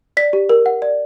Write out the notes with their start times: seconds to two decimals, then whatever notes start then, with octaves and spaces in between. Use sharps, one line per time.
0.17 D5 B6
0.33 G4
0.49 A#4
0.66 F#5
0.82 D5